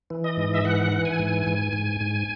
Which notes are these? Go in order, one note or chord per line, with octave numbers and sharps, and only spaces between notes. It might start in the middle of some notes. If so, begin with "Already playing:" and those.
E3
D#5
G#2
E5
E3 F#5
E3
G#5
G#2
G#2
G#2
G#2